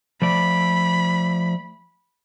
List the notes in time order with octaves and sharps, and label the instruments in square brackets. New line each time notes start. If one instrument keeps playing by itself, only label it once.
[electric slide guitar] F3 A3 D5 [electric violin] B5